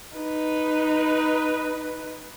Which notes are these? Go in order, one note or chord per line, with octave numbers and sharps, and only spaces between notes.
D#4 B4